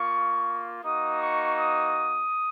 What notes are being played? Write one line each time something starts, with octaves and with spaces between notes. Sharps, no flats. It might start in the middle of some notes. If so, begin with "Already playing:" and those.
Already playing: A#3 F4 C#6
A#3 D#4 F#4 D#6
C#6
D#6